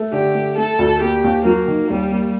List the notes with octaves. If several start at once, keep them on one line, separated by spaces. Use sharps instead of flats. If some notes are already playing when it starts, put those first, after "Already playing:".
Already playing: A3
D3 G4
A3
A3 A4
D2
A#3 G4
D#2
F#3 A#3
D#3
D#2 G3
A#3